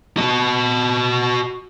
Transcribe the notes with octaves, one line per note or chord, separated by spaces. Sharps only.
F#4 D#5